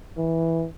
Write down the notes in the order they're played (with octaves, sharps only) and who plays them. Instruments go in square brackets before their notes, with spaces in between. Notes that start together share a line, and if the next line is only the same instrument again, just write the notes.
[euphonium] E3